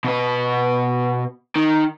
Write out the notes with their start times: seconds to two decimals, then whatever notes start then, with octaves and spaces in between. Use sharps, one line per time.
0.04 B2 B4
1.56 D#3